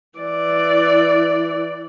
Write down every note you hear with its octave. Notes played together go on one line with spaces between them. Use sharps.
E3 D5